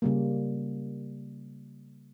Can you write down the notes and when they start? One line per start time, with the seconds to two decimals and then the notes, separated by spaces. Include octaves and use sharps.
0.02 C#3 G3 A#3